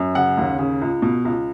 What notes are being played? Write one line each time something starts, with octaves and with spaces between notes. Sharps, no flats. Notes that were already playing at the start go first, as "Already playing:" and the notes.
Already playing: F#2
C#3 F#5
D#2
C#3
C#2
B2
C#2